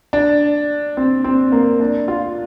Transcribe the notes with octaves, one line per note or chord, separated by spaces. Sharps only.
D4
C4
C4
A#3
D4
F4